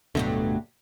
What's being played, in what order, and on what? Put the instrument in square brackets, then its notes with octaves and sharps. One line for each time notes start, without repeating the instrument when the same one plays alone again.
[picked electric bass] D1 B2 D3 [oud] G2 F#3 A3